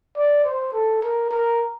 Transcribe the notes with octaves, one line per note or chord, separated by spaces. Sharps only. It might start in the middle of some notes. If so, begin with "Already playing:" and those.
D5
C5
A4
A#4
A#4